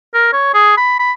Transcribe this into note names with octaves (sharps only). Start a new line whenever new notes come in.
A#4
C#5
G#4
B5
B5